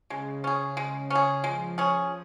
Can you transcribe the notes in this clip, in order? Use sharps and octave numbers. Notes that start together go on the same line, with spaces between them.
C#3 G#3
C#4 G#4
G#3
C#4 G#4
F3 G#3
C#4 G#4